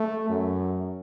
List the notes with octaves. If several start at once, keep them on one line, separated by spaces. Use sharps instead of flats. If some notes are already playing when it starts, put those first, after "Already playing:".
Already playing: A3
F#2